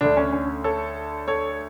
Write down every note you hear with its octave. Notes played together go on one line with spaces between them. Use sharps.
D2 D3 D4
C#4
C#4
A4 C#5
A4 C#5